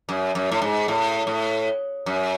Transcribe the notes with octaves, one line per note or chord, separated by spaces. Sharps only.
F#2
F#2
A2
G#2
A2
A2
F#2